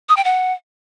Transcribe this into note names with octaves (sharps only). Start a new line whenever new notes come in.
D#6
G5
F#5